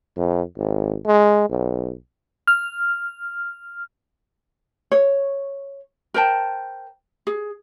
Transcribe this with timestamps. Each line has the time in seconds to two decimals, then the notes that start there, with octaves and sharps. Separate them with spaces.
0.17 F2
0.58 G#1
1.06 G#3
1.50 B1
2.48 F6
4.92 C#5
6.14 A#4 C5 G5 A5
7.27 G#4